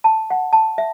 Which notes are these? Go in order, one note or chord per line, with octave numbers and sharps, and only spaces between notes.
A5
F#5
A5
E5